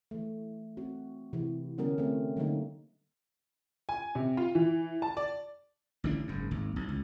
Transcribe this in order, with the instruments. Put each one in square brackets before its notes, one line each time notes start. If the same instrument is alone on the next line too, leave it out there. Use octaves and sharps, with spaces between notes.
[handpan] E3 A3
C4 F#4
C3 E3 E4
D3 G3 B3 C#4 F#4 A#4
A3 C4
D3 F#3 G3 A3 A#3 D#4
[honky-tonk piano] G#5
C3
F4
E3
A5
D5
[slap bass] A1 D3 D4
F#1 G#2
G#1 D#2
B1
C#2